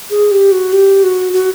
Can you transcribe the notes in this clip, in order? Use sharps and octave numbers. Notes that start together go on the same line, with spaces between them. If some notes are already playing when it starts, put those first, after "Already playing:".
G#4
G4
F#4
G4
F#4
F#4